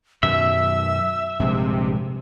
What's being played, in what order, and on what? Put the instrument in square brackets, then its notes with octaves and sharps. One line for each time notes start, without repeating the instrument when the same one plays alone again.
[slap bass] F#2 B2 D#3 [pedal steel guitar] E5 [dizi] E6
[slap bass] A#1 G2 G#3 [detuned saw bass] C3